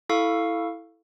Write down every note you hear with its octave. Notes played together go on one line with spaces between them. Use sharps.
E4 A4 F5 C#6